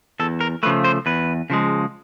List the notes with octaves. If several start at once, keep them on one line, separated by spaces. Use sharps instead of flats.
E2 A4
A#4
C#3 F3 A3 B4
C5
E2 B4
C#3 F3 G#3